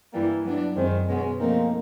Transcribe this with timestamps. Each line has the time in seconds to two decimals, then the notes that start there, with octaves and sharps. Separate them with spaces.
0.13 G2 E3 G3 A#3
0.44 F#3 B3 D4
0.76 F#2 D#3 G#3 C4
1.08 B2 G#3 B3 C#4
1.40 F3 A3 A#3 C4 D#4